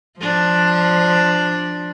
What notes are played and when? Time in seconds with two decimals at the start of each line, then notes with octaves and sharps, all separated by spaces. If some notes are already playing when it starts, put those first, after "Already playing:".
0.19 F3 D4